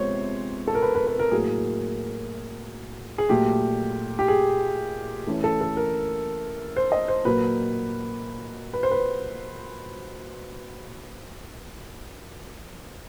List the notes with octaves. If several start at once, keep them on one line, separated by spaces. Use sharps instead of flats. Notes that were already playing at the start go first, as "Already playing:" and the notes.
Already playing: C3 F3 G#3 B3 C5 C#5
A4
A#4
B4
B4
B4
A#4
A2 F#3 A#3 G#4
G#4
A#2 F#3 A3 G4
G4
G#4
E3 A3 C#4
A4
A4
A#4
C5
D#5
C5
A#2 F#3 A#3 B4
B4
C5
B4